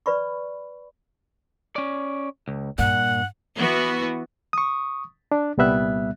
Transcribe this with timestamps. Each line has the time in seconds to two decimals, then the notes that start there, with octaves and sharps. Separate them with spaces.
0.06 B4 D5 B5 C#6
1.76 C#4 D5
2.48 C#2
2.78 G2 A#2 F#5
3.56 E3 B3 F#4
4.53 C#6 D#6
5.32 D4
5.58 C2 A#2 G3 B3 E5 F#6